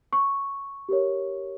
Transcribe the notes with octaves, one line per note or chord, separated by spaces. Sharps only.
C#6
G4 A#4 C#5